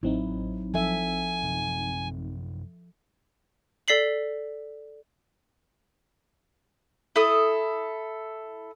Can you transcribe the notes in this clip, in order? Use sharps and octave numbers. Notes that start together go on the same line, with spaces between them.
A1 F#3 C4 D#4 E4
F3 A4 E5 G#5
F#2 C3
A4 D5 B6 C7 F#7
E4 A4 D#6